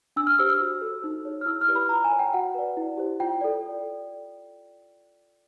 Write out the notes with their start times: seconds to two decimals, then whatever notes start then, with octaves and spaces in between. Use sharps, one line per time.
0.16 D4 E6
0.27 F6
0.39 G4 C5 E6
0.50 E6
0.60 F#4
0.82 A4 C5
1.04 D#4
1.25 G#4 C#5
1.41 F6
1.46 E4 E6
1.61 F6
1.68 G4 B4 D5
1.75 B5
1.89 F4 A#5
2.04 G#5
2.11 A#4 C#5
2.19 G5
2.34 F#4 F#5
2.54 B4 D5
2.77 E4
2.97 G4 C5
3.20 F4 G5
3.41 A4 D5